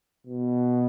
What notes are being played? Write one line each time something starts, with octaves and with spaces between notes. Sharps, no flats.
B2